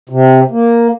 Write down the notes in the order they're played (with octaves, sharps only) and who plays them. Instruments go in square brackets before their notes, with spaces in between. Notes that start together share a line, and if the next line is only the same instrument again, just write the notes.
[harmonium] C3
A#3